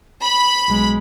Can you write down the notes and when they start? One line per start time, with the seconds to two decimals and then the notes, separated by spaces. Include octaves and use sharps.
0.23 B5
0.68 B1 G#3